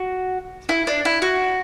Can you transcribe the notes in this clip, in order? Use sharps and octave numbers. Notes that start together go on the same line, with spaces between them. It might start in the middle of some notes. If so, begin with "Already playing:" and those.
Already playing: F#4
E4
D4
E4
F#4